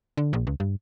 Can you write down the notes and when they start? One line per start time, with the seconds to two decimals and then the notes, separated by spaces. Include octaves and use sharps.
0.17 D3
0.33 A#1
0.47 C#2
0.60 G2